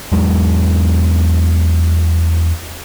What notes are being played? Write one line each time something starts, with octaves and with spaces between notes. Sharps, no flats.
E2 F#3 G#3